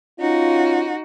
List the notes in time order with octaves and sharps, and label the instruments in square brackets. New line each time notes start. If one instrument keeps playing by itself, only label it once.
[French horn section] C#4 F4 [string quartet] D#4 F#4